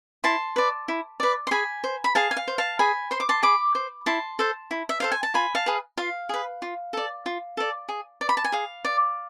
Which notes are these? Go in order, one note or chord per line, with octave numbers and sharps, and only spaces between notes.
E4 A5 C6
B4 D5
E4
B4 D5
C6
G#4 G#5 B5
C5
B5
G#4 F5 A5
G#5
F5
C5
F5 A5
G#4 G#5 B5
C5 C6
D6
A5 C6
G#4 B5 D6
C5
E4 A5 C6
A4 C5
E4
E5
A4 C5 F5
G#5
A5
F4 G#5 B5
F5 A5
G#4 B4
F4 F5
G#4 B4
F4
A4 D5
F4
A4 D5
G#4
D5
B5
A5
G#5
G#4 F5
D5